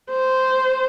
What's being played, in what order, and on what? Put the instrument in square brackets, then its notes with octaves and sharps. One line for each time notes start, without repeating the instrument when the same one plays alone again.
[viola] C5